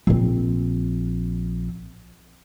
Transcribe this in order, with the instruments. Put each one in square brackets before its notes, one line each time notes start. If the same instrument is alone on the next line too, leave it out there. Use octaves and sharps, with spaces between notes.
[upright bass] A#1 C4